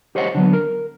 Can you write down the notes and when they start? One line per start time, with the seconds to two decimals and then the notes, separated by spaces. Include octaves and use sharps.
0.15 G4 C5 C#5 D#5 F#5
0.35 D3 F#3 B3
0.53 A#4